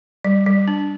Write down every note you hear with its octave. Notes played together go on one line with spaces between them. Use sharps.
G3
G3
D4